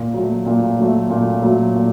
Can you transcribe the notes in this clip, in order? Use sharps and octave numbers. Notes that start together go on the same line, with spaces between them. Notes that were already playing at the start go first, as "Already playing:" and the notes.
Already playing: A#2
F#3 A3
A#2
F#3 A3
A#2
F#3 A3
A#2